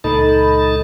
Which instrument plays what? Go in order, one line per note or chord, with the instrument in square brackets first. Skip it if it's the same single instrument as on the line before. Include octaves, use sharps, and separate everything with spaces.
[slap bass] C#2 A#2 G#3 [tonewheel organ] D#4 A5 [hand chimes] A4 [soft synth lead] B5